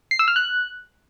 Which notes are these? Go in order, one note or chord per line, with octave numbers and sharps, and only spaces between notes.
C7
E6
F6
F#6